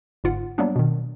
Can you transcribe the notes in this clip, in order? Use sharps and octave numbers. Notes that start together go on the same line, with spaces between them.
G1 G#2 F4 F#5
F#3 G3 A#3 B3 D4
B2 D#3